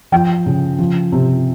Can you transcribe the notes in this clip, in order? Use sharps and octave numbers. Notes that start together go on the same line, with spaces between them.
F3 G5
C#3
F3
C3